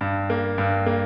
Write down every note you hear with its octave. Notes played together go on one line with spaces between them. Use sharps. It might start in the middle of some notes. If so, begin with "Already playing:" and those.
G2
A#3
G2
A#3